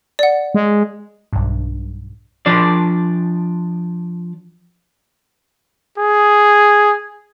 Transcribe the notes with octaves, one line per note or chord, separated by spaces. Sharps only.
D5 F#5
G#3
B1 G2
F3 D4 D5
G#4